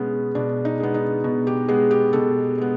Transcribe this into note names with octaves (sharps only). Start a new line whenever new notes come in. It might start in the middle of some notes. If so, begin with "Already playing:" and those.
Already playing: B2 G#3 B3 C#4
B2 D4
D#4
G#3 B3
D#4
B2
G4
G#3 B3 G#4
G4
B2 A4
G#3 B3